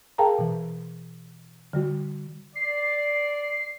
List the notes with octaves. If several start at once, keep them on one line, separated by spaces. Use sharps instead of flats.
G#4 A#4 F5 G5 A5 A#5
B2 E3
D3 G3 F#4
D5 C7